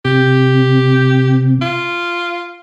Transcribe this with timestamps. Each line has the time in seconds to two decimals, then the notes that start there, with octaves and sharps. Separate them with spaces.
0.05 C3 G4
1.61 F4